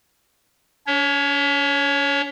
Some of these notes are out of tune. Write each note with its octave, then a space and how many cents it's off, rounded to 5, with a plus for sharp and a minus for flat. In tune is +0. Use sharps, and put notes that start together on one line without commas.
C#4 +45 C#5 +0